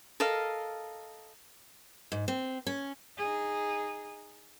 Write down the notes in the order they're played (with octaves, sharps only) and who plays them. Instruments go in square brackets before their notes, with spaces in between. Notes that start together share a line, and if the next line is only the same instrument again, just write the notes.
[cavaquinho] A4 A#4 D#5 F5
[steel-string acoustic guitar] G#2
C4
C#4
[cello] D#4 G#4